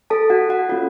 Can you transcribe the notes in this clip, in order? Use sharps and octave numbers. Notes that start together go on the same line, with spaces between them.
A4 A5
F#4 F#5
F#4 F#5
A#3 C#4 F4 A4